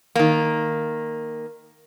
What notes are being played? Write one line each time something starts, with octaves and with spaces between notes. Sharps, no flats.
D#3 A#3